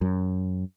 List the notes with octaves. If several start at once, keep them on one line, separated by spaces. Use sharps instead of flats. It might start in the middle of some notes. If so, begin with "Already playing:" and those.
F#2